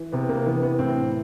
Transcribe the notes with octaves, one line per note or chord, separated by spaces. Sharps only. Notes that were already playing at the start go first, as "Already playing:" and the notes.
Already playing: E3
C3 B3
A#3
E3 B3
B3
A2 C4